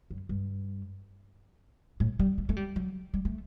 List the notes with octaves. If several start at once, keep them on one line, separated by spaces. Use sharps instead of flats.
F#2
G2
A2
G3
A3
A3
G3
F#3
G3
A3